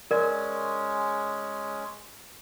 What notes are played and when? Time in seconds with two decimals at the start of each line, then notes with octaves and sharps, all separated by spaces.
0.11 G#3 C#4 A#4 D5